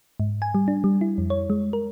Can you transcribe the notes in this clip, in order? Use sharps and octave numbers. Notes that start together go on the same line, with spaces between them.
G#2
G#5
G3
D4
G3
E4
F2
C#5
G#3
A#4